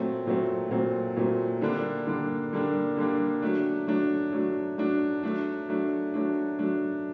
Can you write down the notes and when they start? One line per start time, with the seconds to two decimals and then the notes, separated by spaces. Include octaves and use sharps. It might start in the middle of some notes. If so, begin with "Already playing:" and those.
Already playing: A#2 F#3 A3 C4
0.26 A#2 F#3 A3 C4
0.71 A#2 F#3 A3 C4
1.16 A#2 F#3 A3 C4
1.62 D3 G3 A#3 D4
2.07 D3 G3 A#3 D4
2.52 D3 G3 A#3 D4
2.97 D3 G3 A#3 D4
3.42 F#3 A3 D4
3.87 F#3 A3 D4
4.32 F#3 A3 D4
4.78 F#3 A3 D4
5.23 F#3 A3 D4
5.68 F#3 A3 D4
6.14 F#3 A3 D4
6.59 F#3 A3 D4